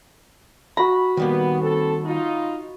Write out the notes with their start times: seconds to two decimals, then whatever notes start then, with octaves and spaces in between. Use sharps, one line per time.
0.77 F#4 A#5 B5
1.17 D#3 G3 A#3 B3
1.61 C4 A4
2.05 D#4 F4